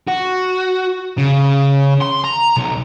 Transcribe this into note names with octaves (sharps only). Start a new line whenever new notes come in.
F#4
C#3
C6
A#5
B1